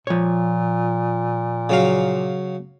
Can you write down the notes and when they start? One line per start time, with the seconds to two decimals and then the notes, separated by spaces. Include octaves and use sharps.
0.07 A#2 F3 C#5
1.69 C#3 F#3 F5